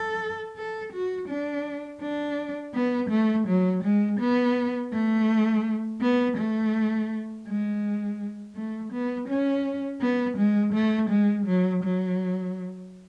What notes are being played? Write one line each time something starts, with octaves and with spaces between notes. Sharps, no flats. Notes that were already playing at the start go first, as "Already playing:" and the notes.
Already playing: A4
A4
F#4
D4
D4
B3
A3
F#3
G#3
B3
A3
B3
A3
G#3
A3
B3
C#4
B3
G#3
A3
G#3
F#3
F#3